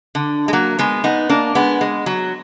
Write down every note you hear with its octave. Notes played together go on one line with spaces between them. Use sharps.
D3
G#3
F#3 A#3
G#3 B3
B3 D#4
A#3 D4
G#3 B3
G#3
F#3